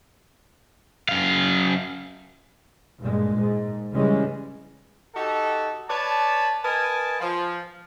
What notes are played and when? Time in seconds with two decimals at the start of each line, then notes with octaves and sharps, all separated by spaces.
1.09 F#2 F5
3.00 G2 A#2 G#3
3.38 G#2
3.94 C#3 E3 G3 G#3 C#4
5.15 D#4 F#4 G4 A4 F#5
5.89 B4 C#5 D5 A5
6.64 A#4 B4 D#5 G#5 A5
7.20 F3